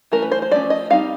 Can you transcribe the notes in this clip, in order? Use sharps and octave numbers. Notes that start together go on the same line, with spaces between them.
E3 A3 C#4 A#4
B4
C5
C5
F3 A3 C#4 D5
D#5
G3 C4 D#4 F5